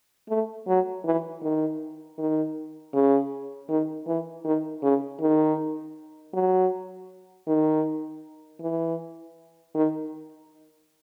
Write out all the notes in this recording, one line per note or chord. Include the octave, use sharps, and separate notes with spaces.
A3
F#3
E3
D#3
D#3
C#3
D#3
E3
D#3
C#3
D#3
F#3
D#3
E3
D#3